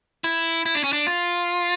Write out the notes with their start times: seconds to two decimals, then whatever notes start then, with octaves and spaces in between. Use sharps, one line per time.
0.24 E4
0.66 E4
0.75 D4
0.84 C#4
0.93 D4
1.07 F4